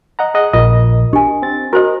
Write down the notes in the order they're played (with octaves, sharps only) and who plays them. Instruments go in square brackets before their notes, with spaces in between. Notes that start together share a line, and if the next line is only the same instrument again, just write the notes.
[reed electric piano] D#5 F#5 A#5
G#4 D#5 F#5
[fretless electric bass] A#1 [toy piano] F4 [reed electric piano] A#4 D#5
[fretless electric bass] D4 [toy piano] G4 G#5
[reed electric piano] C4 A6
[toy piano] F#4 C5 [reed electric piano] A#4 D#5